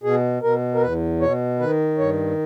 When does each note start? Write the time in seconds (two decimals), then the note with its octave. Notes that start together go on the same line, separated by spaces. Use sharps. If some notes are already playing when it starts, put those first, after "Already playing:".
0.03 B2 G#4
0.42 B2 A#4
0.74 A#4
0.82 E2 B4
1.21 B2 C#5
1.60 D#3 B4
1.98 G2 C#5